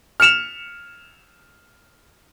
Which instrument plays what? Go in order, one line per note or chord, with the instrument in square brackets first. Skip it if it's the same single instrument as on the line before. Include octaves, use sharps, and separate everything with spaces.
[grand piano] F6 C#7 E7 F7